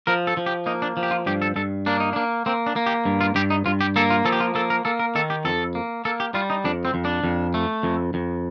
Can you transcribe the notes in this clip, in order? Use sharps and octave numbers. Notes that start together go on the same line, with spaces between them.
F3 A#4
A4
F3
G4
A#3 D#4
D4
F3
G4
F4
G2 G4
A4
G2 A4
A#3 D4
D#4
A#3 D4
A#3 C4
D4
A#3
G4
G2
F4
G2 G4
D#4
G2 F4
G4
A#3 A4
F4
F3 A4
G4
F4
A#3 A4
A#4
A#3 A4
A#4
D#3 A4
G4
F2 A4
A#3
A#3 A4
G4
G3 F4
D#4
F2 D4
C4
F2
D4
F2
A3
F2
F2